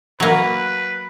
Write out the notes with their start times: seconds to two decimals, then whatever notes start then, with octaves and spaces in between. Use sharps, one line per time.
0.20 F#3 A#3 B4